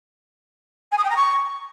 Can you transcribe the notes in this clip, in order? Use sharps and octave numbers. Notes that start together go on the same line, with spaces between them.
G#5
D#6
G5
A#5
C#6